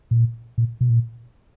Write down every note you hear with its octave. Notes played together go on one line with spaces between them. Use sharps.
A#2
A#2
B2
A#2